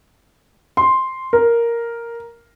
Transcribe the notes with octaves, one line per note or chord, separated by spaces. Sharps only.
C6
A#4